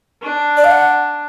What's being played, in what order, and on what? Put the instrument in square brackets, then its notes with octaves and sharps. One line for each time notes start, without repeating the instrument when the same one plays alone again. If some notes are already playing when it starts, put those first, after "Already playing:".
[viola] D4
[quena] D5
F5
F#5